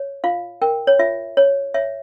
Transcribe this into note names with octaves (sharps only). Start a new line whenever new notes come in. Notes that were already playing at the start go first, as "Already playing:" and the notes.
Already playing: C#5
F4 F5
A#4 G5
C#5
F4 E5
C#5
C#5 E5